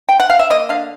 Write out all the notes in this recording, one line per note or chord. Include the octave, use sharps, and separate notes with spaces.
G5
F#5
F5
E5
A#3 D#5
D3 F5